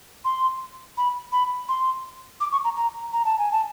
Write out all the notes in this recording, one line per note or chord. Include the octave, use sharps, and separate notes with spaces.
C6
B5
B5
C6
D6
C#6
A#5
A#5
A#5
A5
G#5
A5